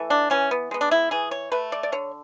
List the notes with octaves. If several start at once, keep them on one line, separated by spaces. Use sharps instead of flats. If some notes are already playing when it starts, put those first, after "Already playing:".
Already playing: E3 A3
D4
E3 C#4
B3
G#3 B3
D4
E4
E3 G#4
C#5
A3 B4
D5
D5
D3 C#5